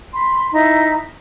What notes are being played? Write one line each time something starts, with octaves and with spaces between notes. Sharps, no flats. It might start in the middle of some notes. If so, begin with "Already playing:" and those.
B5 C6
D#4 E4 E5